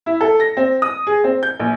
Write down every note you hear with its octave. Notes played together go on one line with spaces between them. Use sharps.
E4
A4
A#6
C4
D#6
G#4
C4
G6
A#1